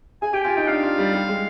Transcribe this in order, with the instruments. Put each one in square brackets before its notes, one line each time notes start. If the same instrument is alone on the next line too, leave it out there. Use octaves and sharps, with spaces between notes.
[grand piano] G#4 [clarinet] G#5
[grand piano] G4 [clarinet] G5
[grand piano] F4 [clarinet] G#5
[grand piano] D#4 [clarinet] G5
[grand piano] D4 [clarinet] F5
[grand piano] F4
G3
G3
G#3